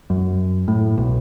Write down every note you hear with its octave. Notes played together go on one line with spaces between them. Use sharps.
F#2
A2
B1